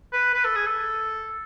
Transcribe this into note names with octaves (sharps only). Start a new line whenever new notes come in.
B4
B4
A4
G#4
A4